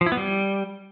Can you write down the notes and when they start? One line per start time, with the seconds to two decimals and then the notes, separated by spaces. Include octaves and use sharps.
0.01 F3
0.06 E4
0.12 B3
0.17 G3